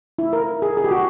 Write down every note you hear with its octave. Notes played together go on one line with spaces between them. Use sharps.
E4
A#4
G#4
G#4
G4
F#4